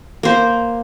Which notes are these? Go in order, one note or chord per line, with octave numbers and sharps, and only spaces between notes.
A#3 C5